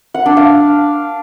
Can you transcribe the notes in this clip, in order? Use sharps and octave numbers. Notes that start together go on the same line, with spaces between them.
F#5
D4
F5